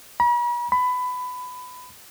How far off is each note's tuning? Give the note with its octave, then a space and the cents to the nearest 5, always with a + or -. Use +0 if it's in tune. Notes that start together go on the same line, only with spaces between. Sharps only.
B5 -45
B5 +20